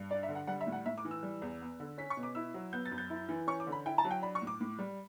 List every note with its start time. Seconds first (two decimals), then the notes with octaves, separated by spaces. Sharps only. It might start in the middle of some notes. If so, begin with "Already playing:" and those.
Already playing: G2
0.11 D4 D5
0.23 E5
0.29 D3
0.35 F#5
0.47 G3 F#5
0.61 E5
0.67 A2
0.72 F#5
0.86 A2 E5
0.98 D6
1.05 E3
1.11 E6
1.23 G3
1.42 E2
1.61 B3
1.80 D3
1.98 C#4 B6
2.10 C#6
2.17 B2
2.23 D6
2.35 E4 E6
2.54 F#3
2.73 B3 G6
2.85 A6
2.91 F#2
2.98 G6
3.10 E4
3.29 E3
3.47 C#4 C#6
3.60 D6
3.67 D3
3.72 B5
3.86 E4 G5
3.98 A5
4.04 F#3
4.11 G5
4.22 D4 B5
4.35 C#6
4.42 A2
4.47 D6
4.61 A2
4.79 G3